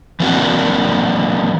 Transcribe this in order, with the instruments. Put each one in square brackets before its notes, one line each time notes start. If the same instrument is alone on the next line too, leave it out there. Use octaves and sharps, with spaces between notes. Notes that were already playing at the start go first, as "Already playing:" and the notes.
[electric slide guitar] E3 F#3 A#3 C4 D4 F#4